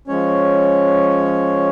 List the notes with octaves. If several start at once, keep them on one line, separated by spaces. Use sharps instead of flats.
F3 G#3 C#4 C#5